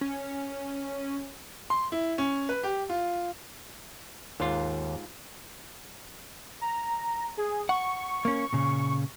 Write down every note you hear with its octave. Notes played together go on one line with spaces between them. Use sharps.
C#4
C6
E4
C#4
B4
G4
F4
D#2 G#2 F4
A#5
G#4
F#5 C#6
A#3 C#4
A#2 C#3